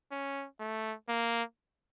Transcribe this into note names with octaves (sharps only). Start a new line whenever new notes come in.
C#4
A3
A#3